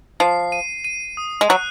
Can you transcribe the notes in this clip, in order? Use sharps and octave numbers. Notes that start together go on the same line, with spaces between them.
F3 C7
D#7
D#7
D#6
G#3
F#3 F#6